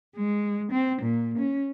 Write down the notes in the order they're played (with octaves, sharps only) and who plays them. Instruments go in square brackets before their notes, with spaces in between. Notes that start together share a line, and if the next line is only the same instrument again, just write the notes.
[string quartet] G#3
C4
A#2
C#4